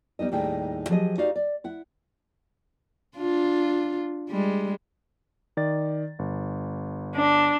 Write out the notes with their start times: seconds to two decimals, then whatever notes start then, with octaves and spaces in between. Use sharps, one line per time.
0.19 G3 B3 D#4 D#5
0.32 D#2 A2 G3 D#4 G#4 G5
0.89 F3 F#3 G4 G#4 C#5 D#5
1.18 D#4 F#4 G4 D5 F5
1.36 D5
1.64 E4 F#5
3.17 D4 F4
4.29 G3 G#3
5.57 D#3 D5 A6
6.19 G1
7.16 D4